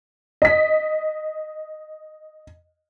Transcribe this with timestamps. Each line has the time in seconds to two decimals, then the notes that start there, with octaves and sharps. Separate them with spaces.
0.42 D#5 B6